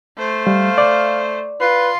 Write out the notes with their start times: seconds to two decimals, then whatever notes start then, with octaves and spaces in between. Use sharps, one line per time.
0.18 A3 C5
0.47 G3 F5
0.78 D5
1.60 F4 B4 C6